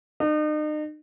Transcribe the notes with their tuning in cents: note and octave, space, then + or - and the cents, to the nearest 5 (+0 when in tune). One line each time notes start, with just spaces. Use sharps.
D#4 -40